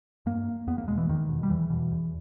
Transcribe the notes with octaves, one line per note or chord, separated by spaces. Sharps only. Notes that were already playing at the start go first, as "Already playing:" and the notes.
G2 A#3
E2 B3
A#3
B2 G#3
E3
E2 D#3
B2
G3
E2 E3
B2
E2